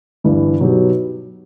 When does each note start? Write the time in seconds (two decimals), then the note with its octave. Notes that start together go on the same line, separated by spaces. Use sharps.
0.24 G1 G2 E3
0.60 B2 F#3 B3 D#4 G4